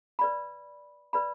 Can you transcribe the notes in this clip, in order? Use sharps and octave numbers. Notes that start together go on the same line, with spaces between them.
B4 D5 B5
B4 D5 B5